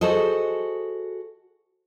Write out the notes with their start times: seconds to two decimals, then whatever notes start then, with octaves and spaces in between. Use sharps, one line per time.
0.01 F#4 G#4 A4 C5 D#5